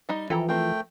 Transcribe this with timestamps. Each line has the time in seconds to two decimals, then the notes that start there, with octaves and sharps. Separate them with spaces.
0.09 G3 D#4 D#5
0.30 E3 F3 A4 G5 A#5
0.49 A3 C4 A#4 G5